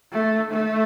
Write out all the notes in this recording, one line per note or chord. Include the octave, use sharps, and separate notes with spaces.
A3
A3